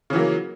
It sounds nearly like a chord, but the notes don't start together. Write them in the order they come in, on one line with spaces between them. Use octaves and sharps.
C#3 E3 F#3 A#3